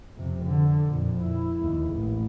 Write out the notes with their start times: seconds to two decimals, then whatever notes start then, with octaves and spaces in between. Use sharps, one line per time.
0.16 F2 C3
0.45 D3
0.86 F2 A#2
1.21 E4
1.60 D#2
1.91 A1